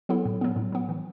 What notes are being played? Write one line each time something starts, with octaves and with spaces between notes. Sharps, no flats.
F#3 B3 E4 A4
A2
F#3 B3
A2
F#3 B3
E3